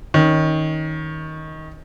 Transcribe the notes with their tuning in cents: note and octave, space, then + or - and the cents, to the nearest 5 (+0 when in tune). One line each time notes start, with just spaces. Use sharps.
D#3 +15 C#4 +0